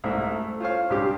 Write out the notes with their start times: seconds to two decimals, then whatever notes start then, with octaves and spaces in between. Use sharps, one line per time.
0.04 C2 G#2 A3 A#3 E5
0.31 A3
0.60 F4 C5 C#5 F5
0.90 C#2 G2 G4